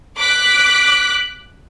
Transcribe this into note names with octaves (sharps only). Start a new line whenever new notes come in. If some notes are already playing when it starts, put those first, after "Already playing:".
D6 F#6 B6